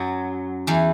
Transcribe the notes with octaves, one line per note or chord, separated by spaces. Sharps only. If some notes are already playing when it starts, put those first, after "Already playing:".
Already playing: F#2 F#3
E2 E3